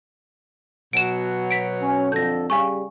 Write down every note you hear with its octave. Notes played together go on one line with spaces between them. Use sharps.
B2 F#3 D7 E7
B6 D7
C#4
F2 D3 A4 G6 A#6
C#3 G3 F5 G#5 C#6